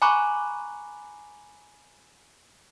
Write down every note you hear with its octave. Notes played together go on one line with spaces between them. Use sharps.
G#5 A#5 B5 C#6 D6 F#6